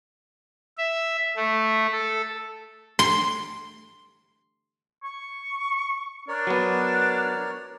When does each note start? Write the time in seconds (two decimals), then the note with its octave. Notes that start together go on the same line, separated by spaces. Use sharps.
0.78 E5
1.36 A3
1.92 A4
2.99 C6
5.04 C#6
6.28 D4 A#4 C#5 D5
6.47 F#3 B3